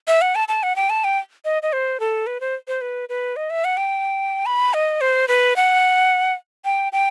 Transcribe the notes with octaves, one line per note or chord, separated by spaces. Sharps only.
E5
F#5
A5
A5
F#5
G5
A5
G5
D#5
D#5
C5
A4
B4
C5
C5
B4
B4
D#5
E5
F#5
G5
B5
D#5
C5
B4
F#5
G5
G5